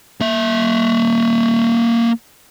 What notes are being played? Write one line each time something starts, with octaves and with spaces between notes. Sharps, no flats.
A#3 E5